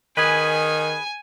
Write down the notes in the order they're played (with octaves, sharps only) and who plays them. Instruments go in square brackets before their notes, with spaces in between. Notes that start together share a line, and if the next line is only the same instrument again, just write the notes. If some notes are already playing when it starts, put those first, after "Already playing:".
[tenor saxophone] D#3 [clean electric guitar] G#4 B4 [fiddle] G#5